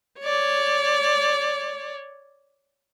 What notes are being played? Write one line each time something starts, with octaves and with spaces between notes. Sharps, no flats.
C#5 D5